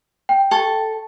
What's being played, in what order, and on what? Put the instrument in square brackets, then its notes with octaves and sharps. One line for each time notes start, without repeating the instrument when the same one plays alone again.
[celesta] G5
[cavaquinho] A4 C#6